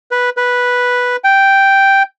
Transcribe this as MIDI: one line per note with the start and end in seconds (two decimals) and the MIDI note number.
0.11 0.30 71
0.37 1.16 71
1.24 2.03 79